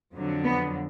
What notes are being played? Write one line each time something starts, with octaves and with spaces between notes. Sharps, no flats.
F2 D3 F#3
B3